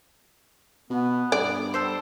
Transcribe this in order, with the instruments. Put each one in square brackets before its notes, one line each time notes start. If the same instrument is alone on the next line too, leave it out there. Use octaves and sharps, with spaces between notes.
[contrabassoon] B2 [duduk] B3
[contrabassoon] G2 [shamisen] D5
[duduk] G3 [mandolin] A4 C5